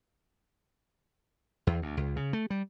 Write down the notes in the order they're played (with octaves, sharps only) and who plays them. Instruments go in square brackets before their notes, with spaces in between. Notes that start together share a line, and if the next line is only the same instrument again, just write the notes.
[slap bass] E2
D2
C#2
C#3
A3
G3